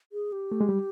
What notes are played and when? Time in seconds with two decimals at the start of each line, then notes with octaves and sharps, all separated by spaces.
0.12 G#4
0.32 G4
0.52 A3
0.61 G#3
0.69 G3